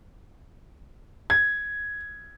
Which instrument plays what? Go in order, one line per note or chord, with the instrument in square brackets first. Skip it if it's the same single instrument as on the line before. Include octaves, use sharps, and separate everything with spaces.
[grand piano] G#6